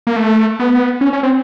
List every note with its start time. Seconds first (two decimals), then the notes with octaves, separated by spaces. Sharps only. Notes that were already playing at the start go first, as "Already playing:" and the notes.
0.07 A#3
0.16 A3
0.59 B3
1.01 C#4
1.13 C#4
1.23 C4